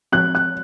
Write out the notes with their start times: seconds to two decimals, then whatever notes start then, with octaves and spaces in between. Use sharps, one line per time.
0.12 F3 G#3 C4 F#4 C#5 F#6
0.35 F#6